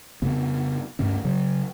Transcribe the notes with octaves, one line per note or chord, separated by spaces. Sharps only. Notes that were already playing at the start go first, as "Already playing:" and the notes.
F2 C#3 B3
D2 G2 D3 C#4
C#3 F#3